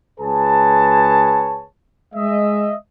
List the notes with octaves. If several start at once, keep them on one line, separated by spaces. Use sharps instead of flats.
C#2 G#4 B4 C#5 A5
G#3 D#5 E5